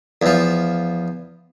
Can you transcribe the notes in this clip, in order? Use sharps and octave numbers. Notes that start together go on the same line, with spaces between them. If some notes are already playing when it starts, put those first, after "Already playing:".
E2 F3